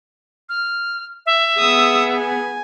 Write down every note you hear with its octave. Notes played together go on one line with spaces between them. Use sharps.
F6
E5
B3 G#4 D#6 E6
G#5